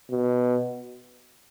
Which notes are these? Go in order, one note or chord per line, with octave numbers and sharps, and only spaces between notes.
B2